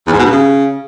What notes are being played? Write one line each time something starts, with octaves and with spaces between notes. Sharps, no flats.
E2
G#2
B2
G2
C#3